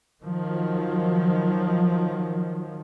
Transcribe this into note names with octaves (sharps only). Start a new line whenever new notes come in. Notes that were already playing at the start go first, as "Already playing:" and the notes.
D#3 F3 F#3